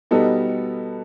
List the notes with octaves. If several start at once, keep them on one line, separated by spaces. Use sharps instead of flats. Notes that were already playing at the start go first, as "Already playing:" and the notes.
B2 G3 B3 D#4 A4